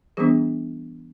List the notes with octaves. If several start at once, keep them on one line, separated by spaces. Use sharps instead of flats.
E3 G3 B3 D4 G#4